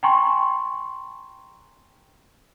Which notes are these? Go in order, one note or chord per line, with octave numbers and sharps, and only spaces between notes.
G5 G#5 A#5 C6 C#6